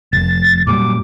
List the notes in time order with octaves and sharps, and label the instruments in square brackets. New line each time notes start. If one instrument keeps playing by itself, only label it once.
[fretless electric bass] F1 [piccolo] A6
[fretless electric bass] F#2 A#2 G3 [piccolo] D6